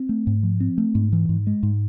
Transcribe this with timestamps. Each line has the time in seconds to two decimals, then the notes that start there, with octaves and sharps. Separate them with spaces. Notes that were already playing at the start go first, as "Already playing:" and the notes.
Already playing: C4
0.09 A3
0.27 G#2
0.43 F3
0.60 C4
0.78 A3
0.95 G#2
1.13 E3
1.29 G#2
1.47 G#3
1.63 G#2